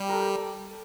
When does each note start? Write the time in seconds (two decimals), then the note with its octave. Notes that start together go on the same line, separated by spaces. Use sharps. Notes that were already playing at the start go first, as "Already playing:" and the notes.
Already playing: G3 G4
0.09 A4 A#4